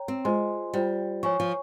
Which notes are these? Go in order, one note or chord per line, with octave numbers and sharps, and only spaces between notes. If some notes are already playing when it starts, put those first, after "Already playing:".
Already playing: C#5 G5 A#5
C4
G#3 F4 C5 D#5 G#5 C6
G3 F4 C5 G5
F3 C#5 G#5 C#6
F3